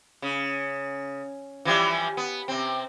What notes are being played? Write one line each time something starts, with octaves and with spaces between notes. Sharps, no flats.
C#3
E3 F3 G3
B3
C3 C4